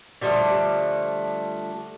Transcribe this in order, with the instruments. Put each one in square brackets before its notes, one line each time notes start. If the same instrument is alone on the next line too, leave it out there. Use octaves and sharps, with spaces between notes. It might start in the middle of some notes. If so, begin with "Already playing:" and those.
[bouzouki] D3 F3 G3 A3